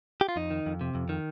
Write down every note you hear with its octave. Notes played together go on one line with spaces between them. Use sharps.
G4
F4
F2 D#4
D#3
F2
C3
F2
D#3